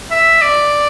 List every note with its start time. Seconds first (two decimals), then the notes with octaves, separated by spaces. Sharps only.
0.11 E5
0.42 D5